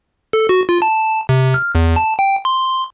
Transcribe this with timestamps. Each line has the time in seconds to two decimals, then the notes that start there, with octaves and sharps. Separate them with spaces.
0.33 A4
0.49 F#4
0.69 F4
0.82 A5
1.29 C3
1.54 F6
1.75 E2
1.96 A5
2.19 G5
2.45 C6